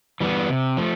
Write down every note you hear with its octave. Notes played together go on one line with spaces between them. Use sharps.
E3 G3 B3
C3
F3 A3